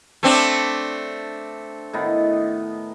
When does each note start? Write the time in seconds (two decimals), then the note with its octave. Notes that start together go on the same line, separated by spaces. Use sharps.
0.23 A3 C4 D4
1.93 A2 D#3 B3